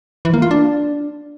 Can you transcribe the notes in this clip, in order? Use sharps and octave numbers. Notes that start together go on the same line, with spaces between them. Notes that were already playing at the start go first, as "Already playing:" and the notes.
E3
A#3
F4
D4